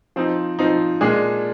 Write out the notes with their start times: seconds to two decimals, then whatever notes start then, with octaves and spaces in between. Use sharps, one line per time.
0.16 F3 C4 D#4
0.59 F3 C4 D#4
1.01 A#2 G#3 D4 G#4